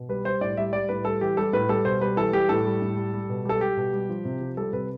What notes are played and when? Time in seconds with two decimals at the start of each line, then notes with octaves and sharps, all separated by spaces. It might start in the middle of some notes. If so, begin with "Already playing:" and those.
Already playing: B2
0.09 G3 B4
0.25 G3 C5
0.41 A2 D5
0.57 G3 E5
0.73 G3 D5
0.89 A2 B4
1.05 G3 A4
1.21 E3 G4
1.37 G3 A4
1.53 A2 B4
1.69 G3 A4
1.85 B2 C5
2.01 G3 B4
2.17 E3 A4
2.33 G3 G4
2.49 A2 A4
2.65 G3
2.82 A2
2.97 G3
3.13 G3
3.29 B2
3.45 G3 A4
3.61 G3 G4
3.77 B2
3.93 G3
4.09 F3
4.25 C3
4.41 F3
4.57 G3 A4
4.73 C3 B4